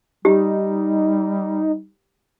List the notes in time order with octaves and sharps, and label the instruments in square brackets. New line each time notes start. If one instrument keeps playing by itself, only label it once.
[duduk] G3 [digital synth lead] D#4 [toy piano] G4